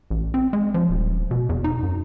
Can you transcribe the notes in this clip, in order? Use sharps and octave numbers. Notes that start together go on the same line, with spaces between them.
A1
C4
G#3
F3
D#1
B2
E2
D#4
F#2